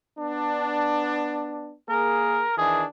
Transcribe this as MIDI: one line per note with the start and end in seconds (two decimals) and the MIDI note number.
0.19 1.74 59
0.19 1.74 62
1.89 2.46 58
1.89 2.46 68
1.89 2.57 70
2.58 2.84 51
2.58 2.84 52
2.58 2.84 62
2.58 2.85 68